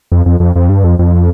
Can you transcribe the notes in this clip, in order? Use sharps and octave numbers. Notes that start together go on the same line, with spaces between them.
F2
F2
F2
F2
G2
F2
F2